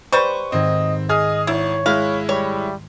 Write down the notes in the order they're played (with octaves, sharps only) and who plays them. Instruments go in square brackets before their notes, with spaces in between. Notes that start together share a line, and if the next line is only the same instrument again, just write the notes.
[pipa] G3 B4 C5 [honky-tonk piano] C#6
[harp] G#2 D#3 G#6 [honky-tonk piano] C4 [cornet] D#5
[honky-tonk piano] G#4 D#6 F6 [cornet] D#5
[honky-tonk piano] G#1 [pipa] E4 [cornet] C#5
[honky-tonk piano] G#3 E4 [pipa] F5 [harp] F6 F#6
[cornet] G3 [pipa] C#5